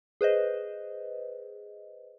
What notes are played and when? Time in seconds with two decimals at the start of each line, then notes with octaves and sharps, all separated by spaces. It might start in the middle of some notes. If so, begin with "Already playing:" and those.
0.21 G#4 B4 C5 D#5